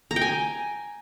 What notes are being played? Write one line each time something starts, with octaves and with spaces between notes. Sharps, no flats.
A#5
G5
G#5